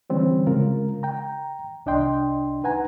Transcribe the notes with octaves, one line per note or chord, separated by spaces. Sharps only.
D3 E3 G3 C4 C#4
C#3 G#3 F4 A#4
G5 A#5
C2 D4 D#5 G5 C6
D#4 B4 F#5 G#5 A#5